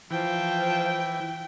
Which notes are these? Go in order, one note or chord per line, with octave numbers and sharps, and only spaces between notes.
E3 F3 G5